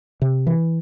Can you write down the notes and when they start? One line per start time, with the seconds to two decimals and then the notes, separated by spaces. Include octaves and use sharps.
0.22 C3
0.47 E3